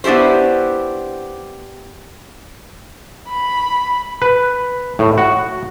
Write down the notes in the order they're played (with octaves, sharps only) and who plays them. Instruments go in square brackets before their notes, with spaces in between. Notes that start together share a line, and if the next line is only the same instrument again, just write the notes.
[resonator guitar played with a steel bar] B3 D4 E4 G4 C5
[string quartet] B5
[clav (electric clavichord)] B4
A2
F#4